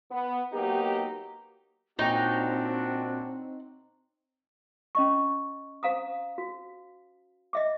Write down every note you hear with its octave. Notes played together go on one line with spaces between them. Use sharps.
B3
F#3 A#3 B3 D#4 G4
A#2 C4 D4 D#4 F#4 C#5 G5
C#4 D#5 C#6
C5 F5 A#5 D#6
F#4
D#5 E5 D6